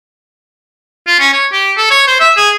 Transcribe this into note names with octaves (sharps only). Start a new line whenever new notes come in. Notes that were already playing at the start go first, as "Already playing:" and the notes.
F4
C#4
C#5
G4
A4
C#5
C5
E5
G#4